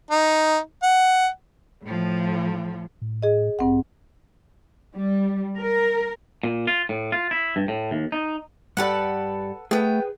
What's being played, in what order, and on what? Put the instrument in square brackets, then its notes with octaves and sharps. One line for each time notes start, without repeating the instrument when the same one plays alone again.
[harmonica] D#4
F#5
[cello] A2 F3
[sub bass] A2
[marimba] G#4 D#5
[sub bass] A1 [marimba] G2 C4 F#5
[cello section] G3
A#4
[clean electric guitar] A#2
F4
A2
F4
E4
G2
A2
D#2
D#4
[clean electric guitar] G2 G4 D5 [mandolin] A4 B4 F#5
[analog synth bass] A3 [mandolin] B3 G5 [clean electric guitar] G#4 B4